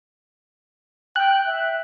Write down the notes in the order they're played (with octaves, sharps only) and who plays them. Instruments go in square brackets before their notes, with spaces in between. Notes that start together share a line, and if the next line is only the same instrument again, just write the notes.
[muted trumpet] G5 [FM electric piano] F#6
[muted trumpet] E5